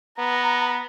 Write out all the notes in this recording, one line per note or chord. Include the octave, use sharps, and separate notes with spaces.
B3 A#5